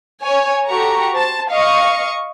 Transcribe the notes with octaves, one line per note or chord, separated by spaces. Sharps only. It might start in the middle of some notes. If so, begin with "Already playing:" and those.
C#5 G#5
F#4 G4 A4 A#5 C#6
C5 A5
D#5 F5 C#6